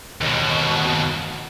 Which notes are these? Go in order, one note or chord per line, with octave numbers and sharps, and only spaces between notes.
D#2 B2